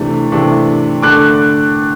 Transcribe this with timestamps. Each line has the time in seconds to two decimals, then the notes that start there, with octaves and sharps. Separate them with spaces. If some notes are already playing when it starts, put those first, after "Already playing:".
Already playing: C3 E3 A3 D4
0.32 C3 E3 A3 D4
1.02 D3 A3 D4 D6 F#6